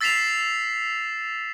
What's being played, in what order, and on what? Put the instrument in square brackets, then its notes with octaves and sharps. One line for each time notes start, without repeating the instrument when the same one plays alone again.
[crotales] E6 A6 B6 C7 E7 F7